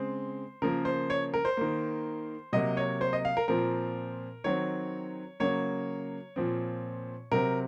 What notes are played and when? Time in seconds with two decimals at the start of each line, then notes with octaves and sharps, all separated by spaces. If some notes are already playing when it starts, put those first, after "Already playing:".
Already playing: C#3 G#3 C4 C5
0.62 C#3 F3 A#3 A#4
0.85 C5
1.10 C#5
1.34 A#4
1.45 C5
1.57 D#3 A#3
2.53 C3 F#3 A#3 D#5
2.77 C#5
3.01 C5
3.13 D#5
3.25 F5
3.37 A#4
3.48 A#2 F3 C4 A#4
4.44 D#3 F#3 C4 C#5
5.40 C#3 F#3 A#3 C#5
6.36 A#2 F3 C4
7.31 C3 F#3 C4 A#4